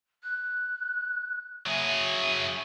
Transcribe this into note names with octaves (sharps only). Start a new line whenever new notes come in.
F#6
F#3 G#4 E5